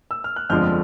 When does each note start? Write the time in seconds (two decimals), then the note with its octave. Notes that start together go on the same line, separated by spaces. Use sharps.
0.11 E6
0.24 F6
0.36 F#6
0.50 G1 F2 D3 F3 G#3 F6 G6